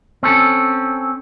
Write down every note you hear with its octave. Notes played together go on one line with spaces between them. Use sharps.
C4 C#4 A4